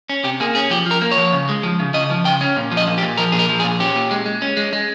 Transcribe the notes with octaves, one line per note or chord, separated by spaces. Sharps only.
C#4
C3 G4
A#3 G#4
C#4 G#4
F3 G4
F3 A#4
A#3
C#5
F3
C#3
G#3
F3
C#3
C#3 D#5
F3
C#3 G5
C#4
A#2
F3
D#5
A#2
G4
A#2
F3 A#4
A#2 G#4
A#4
F3
G#4
A#2
C#4 G4
A#2
G#3
G#3
C#4
G#3
G#3